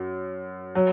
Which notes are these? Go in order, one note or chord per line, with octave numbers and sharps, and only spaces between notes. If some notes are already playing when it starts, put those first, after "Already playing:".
Already playing: F#2
F#3